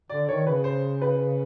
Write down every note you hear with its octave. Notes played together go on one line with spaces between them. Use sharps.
D3 D5
D#3 C#5
C#3 B4
C5
B4